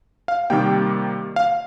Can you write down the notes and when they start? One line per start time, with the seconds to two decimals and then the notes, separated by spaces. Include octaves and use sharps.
0.28 F5
0.50 C3 D#3 G3 A#3 G5
1.36 F5